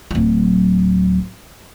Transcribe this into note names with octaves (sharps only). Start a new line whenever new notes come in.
D1 F#3